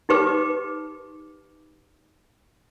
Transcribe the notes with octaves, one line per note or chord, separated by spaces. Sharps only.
D#4 G4 B4 D6